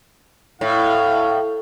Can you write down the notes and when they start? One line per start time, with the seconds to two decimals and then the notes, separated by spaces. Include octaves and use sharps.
0.61 A2 E4 F5